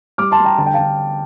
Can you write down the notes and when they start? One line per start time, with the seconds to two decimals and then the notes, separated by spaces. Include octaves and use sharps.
0.18 G3 D6 F6
0.31 A5 C6
0.39 G3
0.45 G5 A#5
0.58 D3 A5
0.66 G5
0.74 D3 F5 A5